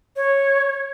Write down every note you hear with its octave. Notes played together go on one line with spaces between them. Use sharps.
C#5